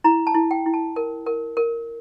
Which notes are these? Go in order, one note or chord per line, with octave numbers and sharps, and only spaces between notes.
E4 A#5
A5
E4
G5
E4
A5
A#4
A#4
A#4